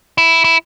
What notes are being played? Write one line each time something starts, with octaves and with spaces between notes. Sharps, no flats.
E4
E4